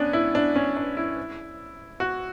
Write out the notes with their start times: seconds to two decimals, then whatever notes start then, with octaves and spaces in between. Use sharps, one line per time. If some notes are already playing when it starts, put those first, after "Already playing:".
Already playing: B3 C#4 D4
0.13 E4
0.35 D4
0.56 C#4
0.76 D4
0.97 E4
2.00 F#4